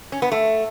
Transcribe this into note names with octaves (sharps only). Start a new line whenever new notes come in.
C#4
B3
A3